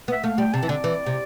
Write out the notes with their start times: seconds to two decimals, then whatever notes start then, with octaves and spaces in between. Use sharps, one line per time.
0.08 B3
0.12 E5
0.24 A3 F5
0.38 G3 G5
0.53 C3 A5
0.63 E3
0.69 D3 D5
0.84 E3
1.06 C3